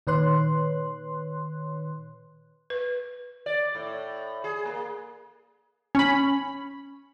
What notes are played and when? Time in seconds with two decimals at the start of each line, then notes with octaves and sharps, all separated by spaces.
0.07 A#2 D#3 B4 C#5 C6 F#6
2.70 B4
3.46 D5
3.75 A2
4.44 G#4
4.66 A#3
5.95 C#4 B5